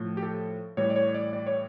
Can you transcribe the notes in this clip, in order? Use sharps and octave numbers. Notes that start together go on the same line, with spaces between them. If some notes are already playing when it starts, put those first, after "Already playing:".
Already playing: A2 F3
G4
A4
A2 E3 G3 C#5
D5
C#5
D5
D5
C#5